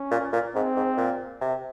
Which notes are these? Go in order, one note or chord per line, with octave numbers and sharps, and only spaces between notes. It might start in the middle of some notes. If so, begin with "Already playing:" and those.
Already playing: C#4
A#2
A#2
G#2 C4
G#2
A#2
C3